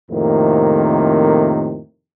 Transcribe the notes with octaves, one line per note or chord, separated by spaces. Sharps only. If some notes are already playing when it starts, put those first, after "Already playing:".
F2 A2 C3 D#3 A#3